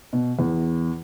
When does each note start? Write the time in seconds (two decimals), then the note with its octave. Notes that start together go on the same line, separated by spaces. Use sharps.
0.13 B2
0.39 E2